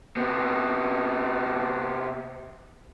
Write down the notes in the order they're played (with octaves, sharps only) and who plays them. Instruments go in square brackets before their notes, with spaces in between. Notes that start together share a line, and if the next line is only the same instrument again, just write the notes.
[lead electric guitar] C3 B3